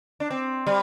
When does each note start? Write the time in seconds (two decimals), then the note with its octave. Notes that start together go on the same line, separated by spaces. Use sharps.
0.20 D4
0.30 C4
0.67 G3